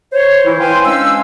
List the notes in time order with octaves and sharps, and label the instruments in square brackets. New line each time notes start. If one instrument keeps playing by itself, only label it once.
[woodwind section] C5 C#5
E3 E4
B4 C5 F5 G5 G#5 C6
G#3 C#4 D4 F5 E6